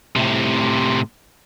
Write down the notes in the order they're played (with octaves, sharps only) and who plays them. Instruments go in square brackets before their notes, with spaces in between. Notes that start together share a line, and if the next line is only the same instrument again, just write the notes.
[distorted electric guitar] A2 C3